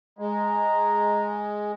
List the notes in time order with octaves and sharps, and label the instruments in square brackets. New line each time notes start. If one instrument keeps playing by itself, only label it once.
[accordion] G#3 [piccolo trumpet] A#5